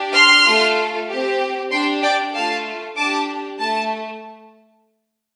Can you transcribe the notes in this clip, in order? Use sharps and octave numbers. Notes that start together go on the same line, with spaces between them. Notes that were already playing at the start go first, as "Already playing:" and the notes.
Already playing: D4 G4
C6 F6
A3 F4 A4
C4 G4
D4 G4 G5 C6
D5 G5
A3 F4 A4 F5 A5
D4 G4 A5 D6
A3 A5